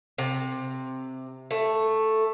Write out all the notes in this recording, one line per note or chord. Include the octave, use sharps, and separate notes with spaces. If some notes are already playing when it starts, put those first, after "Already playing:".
C3
A3